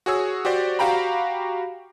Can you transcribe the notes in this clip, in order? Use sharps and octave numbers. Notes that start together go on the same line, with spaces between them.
F#4 G#4 C#5 E6
F#4 G4 C5 D5
F#4 G4 F5 G5 A#5 B5